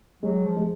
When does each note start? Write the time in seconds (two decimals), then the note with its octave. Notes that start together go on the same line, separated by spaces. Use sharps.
0.23 F#3 G#3
0.45 F3
0.56 G#3